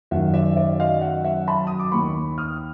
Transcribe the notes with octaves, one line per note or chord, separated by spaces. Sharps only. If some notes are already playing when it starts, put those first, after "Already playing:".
F#2 D#3 E5 F#5
D5 E5
D5 E5
D#5 F5
E5 F#5
E5 F#5
A5 B5
D#6
D6
D#2 D#3 B5 C#6
D#6 F6